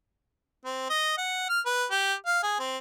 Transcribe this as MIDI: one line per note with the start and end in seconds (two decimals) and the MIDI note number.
0.65 0.88 60
0.90 1.15 75
1.18 1.45 78
1.49 1.61 89
1.66 1.86 71
1.91 2.14 67
2.26 2.41 77
2.43 2.56 68
2.60 2.77 60